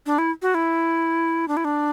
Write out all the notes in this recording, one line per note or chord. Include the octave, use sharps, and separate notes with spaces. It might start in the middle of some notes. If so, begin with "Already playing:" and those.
D4
E4
F#4
E4
D4
E4
D4